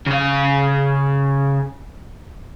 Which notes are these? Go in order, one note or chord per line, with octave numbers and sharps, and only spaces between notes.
C#3 F5